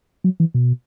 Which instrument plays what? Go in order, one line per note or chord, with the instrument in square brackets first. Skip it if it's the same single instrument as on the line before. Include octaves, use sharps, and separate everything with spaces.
[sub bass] F#3
E3
B2